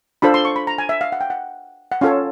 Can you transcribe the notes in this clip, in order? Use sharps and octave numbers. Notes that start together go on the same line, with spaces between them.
D4 F4 A4 C5 B5
C6
C#6
B5
A#5
G#5
E5
F5
F#5
G5
F#5
F#5
C#4 F4 A4 C#5 F5